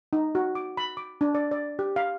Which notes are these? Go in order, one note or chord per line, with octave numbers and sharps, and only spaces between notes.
D#4
F#4
D6
B5
D6
D4
D5
D5
G4
F5